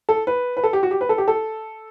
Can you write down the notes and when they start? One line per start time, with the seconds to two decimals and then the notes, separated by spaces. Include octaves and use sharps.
0.09 A4
0.27 B4
0.57 B4
0.64 A4
0.73 G4
0.83 F#4
0.91 G4
1.01 B4
1.09 A4
1.18 G4
1.28 A4